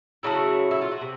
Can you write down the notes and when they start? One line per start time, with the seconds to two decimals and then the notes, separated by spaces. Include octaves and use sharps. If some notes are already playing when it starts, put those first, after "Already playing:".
0.23 C#3 F#3 A3 E4 F#4
0.71 E4
0.82 F4
0.92 F#4
1.01 C3